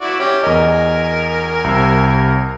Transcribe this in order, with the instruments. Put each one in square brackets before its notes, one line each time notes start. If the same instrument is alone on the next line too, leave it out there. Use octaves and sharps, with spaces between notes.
[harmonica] E4 F#4 D5
C#4 G4
[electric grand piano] E2 D#5 [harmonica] A#4 G#5
[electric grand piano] C2 C3 E6